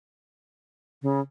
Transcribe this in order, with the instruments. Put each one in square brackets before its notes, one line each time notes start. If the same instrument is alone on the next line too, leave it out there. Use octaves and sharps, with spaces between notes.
[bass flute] C#3